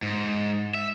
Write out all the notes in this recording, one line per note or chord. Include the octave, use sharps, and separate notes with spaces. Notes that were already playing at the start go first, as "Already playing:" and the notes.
G#2
E5